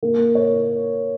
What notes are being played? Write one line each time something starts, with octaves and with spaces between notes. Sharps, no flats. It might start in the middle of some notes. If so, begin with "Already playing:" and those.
A#3
C#5